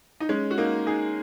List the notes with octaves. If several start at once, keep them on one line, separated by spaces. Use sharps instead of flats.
D#4
G#3 C#4
F#4
A#3 D#4
D#4 G#4